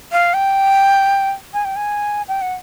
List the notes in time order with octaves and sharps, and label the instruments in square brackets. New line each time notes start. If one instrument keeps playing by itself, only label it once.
[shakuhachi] F5
G5
G#5
G5
G#5
G5
F#5